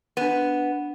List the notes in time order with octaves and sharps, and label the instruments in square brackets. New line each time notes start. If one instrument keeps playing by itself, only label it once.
[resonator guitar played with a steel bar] B3 [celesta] D4 D#7